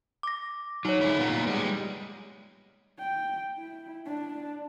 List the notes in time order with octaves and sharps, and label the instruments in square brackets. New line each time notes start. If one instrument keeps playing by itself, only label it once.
[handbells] D6 A#6
[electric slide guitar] F#3 [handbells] D#4 C#5
[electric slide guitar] D3 G#3 E4
A#2 A#3 B3
G3 G#3
[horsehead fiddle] G5
E4
D4